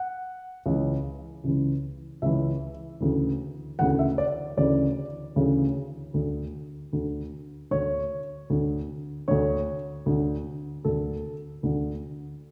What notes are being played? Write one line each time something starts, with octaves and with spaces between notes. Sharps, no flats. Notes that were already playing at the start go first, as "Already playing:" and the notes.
Already playing: F#5
C#2 C#3 E3
C#2 C#3 E3
C#2 C#3 E3 E5
D2 C#3 E3
D2 C#3 E3 F#5
E5
D5
D2 C#3 E3 D5
D2 C#3 E3
D2 D3
D2 D3
D2 D3 C#5
D2 D3
D2 D3 C#5
D2 D3
D2 D3 A4
D2 D3